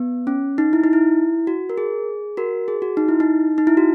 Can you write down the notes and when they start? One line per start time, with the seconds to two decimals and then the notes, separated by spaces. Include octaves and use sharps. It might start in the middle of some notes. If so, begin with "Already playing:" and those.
Already playing: B3
0.27 C#4
0.58 D#4
0.73 E4
0.84 D#4
0.93 E4
1.47 F#4
1.70 A#4
1.78 G#4
2.37 F#4 A#4
2.68 G#4
2.82 F#4
2.97 D#4
3.08 E4
3.20 D#4
3.58 D#4
3.67 E4
3.77 F#4